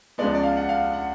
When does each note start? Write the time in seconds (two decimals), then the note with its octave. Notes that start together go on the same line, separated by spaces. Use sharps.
0.18 C#2 C#3 F3 G#3 B3 D5
0.35 D5
0.43 F5
0.57 F#5
0.69 F5
0.93 F#5